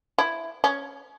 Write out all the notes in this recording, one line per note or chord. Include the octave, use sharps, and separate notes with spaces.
E4
C#4